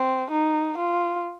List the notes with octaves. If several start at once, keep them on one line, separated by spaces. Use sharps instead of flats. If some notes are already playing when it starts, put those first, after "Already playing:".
Already playing: C4
D#4
F4